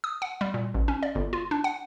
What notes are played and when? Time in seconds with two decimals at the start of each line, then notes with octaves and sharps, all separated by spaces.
0.04 D#6
0.22 F#5
0.41 G3
0.54 A#2
0.74 A1
0.88 C#4
1.03 D5
1.15 G1
1.33 F4
1.51 D4
1.64 F#5